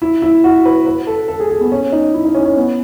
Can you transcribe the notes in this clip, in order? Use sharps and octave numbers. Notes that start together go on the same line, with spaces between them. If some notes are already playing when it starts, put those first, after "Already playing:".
E4
E4
F#4
B4
B4
A4
A4
G#4
G#4
B3
C#4
D#4
E4
D#4
C#4
C#4
B3